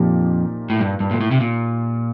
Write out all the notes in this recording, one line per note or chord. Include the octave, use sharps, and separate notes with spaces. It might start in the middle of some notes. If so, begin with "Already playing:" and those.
Already playing: F2 A#2 F3 A#3 D#4 G4
A2
G2
G2
A#2
A2
C3
A#2